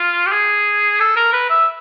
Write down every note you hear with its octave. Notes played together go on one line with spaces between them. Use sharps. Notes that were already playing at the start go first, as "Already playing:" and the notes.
Already playing: F4
G4
G#4
A4
A#4
B4
E5